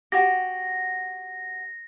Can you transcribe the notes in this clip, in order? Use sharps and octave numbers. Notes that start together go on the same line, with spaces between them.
F#4 G4 A#6